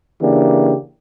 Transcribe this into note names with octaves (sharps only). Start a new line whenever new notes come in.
C#3 E3 A#3 D4 G4